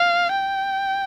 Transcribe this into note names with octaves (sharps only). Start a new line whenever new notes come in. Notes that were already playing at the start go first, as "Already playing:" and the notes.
Already playing: F5
G5